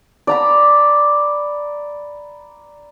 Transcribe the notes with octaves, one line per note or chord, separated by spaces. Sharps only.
D5 A#5 B5